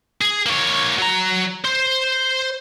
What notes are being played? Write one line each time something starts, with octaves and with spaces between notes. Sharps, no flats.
G#4
A#3 C#5
F#3 A#5
C5